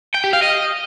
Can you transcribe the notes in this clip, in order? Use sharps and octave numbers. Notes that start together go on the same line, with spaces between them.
G5
G4
F5
D#5